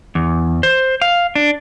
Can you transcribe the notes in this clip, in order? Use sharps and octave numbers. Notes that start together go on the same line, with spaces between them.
E2
C5
F5
D4